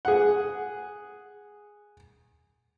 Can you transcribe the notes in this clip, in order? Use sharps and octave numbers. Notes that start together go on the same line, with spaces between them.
G#4 F#5